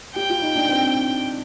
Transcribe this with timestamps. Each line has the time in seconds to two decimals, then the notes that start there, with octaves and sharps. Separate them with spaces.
0.15 G4 G5
0.30 F4
0.42 D#4
0.56 D4
0.69 C4